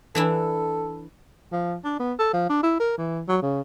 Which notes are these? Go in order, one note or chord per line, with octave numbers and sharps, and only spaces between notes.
E3 D4 E4 A4
F3
D4
B3
A4
F3
D4
E4
A#4
E3
F#3
C#3